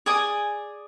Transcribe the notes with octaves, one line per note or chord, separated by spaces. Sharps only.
G#4 D5 G#5 D#6